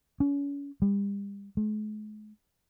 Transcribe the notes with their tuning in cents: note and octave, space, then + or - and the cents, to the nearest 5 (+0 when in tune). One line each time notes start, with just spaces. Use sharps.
C#4 +35
G3 +35
G#3 +45